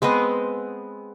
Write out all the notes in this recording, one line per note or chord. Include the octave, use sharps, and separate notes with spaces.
G#3 B3 C4 D#5